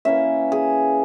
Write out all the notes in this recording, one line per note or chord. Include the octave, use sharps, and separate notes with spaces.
E3 A#3 C#4 E5
G#4